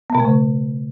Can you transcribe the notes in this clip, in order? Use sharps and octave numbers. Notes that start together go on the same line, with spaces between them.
B3
B2
A3
C#3